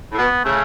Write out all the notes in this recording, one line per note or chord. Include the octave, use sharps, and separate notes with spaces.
A2
B2 B3
C#3 A3